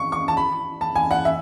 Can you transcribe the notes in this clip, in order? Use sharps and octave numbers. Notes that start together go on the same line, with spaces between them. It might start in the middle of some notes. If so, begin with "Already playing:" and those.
Already playing: C#6
C#6
A5
B5
A5
G#5
F#5
E5